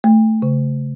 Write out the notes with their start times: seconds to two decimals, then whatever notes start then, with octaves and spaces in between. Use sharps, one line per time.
0.04 A3
0.42 C#3